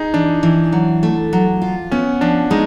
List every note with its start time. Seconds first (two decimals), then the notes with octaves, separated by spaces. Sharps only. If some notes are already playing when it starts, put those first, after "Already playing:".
Already playing: D#4 G#4
0.14 E3 D4
0.43 E3
0.72 F#3
1.03 A3
1.33 F#3
1.62 F4
1.91 B3 C#4
2.21 F3 D4
2.51 G#3 D#4